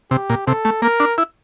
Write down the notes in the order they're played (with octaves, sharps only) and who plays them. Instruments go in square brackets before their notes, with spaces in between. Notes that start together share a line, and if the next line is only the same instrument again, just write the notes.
[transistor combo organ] C3 [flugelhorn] G4
[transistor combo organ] A#2
[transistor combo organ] C3 [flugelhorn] A4
[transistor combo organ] A3
[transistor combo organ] A#3 [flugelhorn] A#4
[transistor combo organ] D4
E4